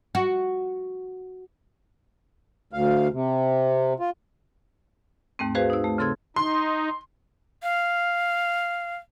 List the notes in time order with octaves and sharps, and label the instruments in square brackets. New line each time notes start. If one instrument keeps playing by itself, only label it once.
[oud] F#4
[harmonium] D2 F5
C3
F4
[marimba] D#2 G#2 A3 C4
F#4 G#4 B4 C5 F5
D#4 E6
A3
C#3 C4 A4 C6 E6 G#6
[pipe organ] D#4 [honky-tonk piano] C6
[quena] F5